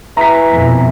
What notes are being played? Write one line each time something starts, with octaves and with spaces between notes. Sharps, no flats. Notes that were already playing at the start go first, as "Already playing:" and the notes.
E3 A#5 B6
F2 B2